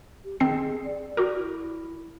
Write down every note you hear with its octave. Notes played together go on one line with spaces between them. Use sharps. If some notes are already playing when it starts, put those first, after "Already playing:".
G4
D#3 C4 G#4 C7
D5
F#4 G4 A#4
E4